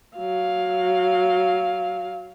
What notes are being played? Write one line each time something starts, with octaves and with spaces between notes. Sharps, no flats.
F#3 F5